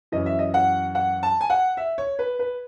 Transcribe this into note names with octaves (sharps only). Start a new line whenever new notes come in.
F#2 E3 D#5
E5
D#5
F#5
F#5
A5
G#5
F#5
E5
C#5
B4
B4